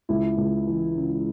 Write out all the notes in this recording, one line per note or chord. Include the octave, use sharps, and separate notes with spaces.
C#2 E4
C#2
E3
C#3